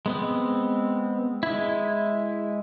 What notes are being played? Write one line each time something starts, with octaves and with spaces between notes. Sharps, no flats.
G#3 B3 C4
G#3 E4